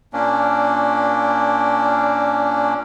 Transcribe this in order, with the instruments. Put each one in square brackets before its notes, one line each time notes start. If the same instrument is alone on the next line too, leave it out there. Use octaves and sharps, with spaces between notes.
[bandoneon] A#2 A#3 C#4 D4